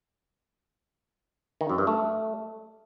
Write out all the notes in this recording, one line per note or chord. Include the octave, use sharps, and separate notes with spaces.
D#3
F#2
G2
A3